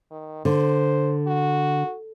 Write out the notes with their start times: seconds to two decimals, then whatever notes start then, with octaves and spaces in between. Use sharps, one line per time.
0.11 D#3
0.45 D3 C5
1.27 F#4